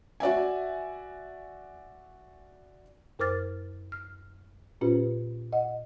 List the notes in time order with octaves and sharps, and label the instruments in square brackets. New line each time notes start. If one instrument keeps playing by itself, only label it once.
[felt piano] F#4 D5 E5 G#5
[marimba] F#2 A#4 C5 D6 F6 A6
F6
A#2 C#4 F4 G4 B4 C5
D#5 F#5